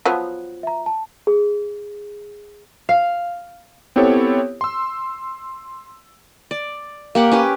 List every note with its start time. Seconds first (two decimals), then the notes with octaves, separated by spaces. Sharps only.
0.06 F3 F#3 B3
0.63 E5 A#5
0.86 A5
1.27 G#4
2.89 F5
3.96 B3 C4 E4 G4 A4 C#5
4.61 C6 E6
6.51 D5
7.15 A#3 G4 F#5
7.32 C#4 G4 B4